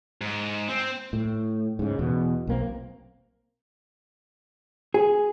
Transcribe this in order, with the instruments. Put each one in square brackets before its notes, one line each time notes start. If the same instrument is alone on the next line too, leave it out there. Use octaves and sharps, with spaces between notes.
[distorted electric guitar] G#2
C4
[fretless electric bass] A2
G#2 C#3
E2 B2
B1 A#3 C4
[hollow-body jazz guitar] G#4